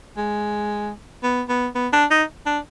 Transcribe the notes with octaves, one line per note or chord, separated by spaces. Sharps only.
G#3
B3
B3
B3
D4
D#4
D4